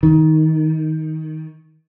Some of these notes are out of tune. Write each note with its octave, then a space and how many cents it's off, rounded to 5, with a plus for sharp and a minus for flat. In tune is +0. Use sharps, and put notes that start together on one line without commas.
D#3 +15